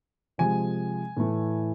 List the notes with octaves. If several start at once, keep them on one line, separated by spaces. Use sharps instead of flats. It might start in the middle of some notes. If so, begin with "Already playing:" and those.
C3 F3 G#3 G#5
A2 E3 A3